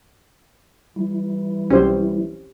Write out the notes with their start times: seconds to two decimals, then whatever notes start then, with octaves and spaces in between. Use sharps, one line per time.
0.96 E3 G3 E4
1.70 B1 C4 C#4 G4 C5